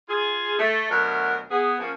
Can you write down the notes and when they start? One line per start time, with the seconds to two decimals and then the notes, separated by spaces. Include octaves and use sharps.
0.09 F4 G#4
0.59 A3
0.90 D2 B2 F#3 A#4
1.50 B3 G#4
1.80 F3 A#3 C#4